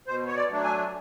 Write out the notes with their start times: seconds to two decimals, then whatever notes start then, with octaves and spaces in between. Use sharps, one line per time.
0.07 B2 C5
0.27 C#5
0.36 D5
0.50 F#3 A3 D4
0.64 G#5